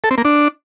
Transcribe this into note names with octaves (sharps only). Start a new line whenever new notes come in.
A4
C4
A#3
D4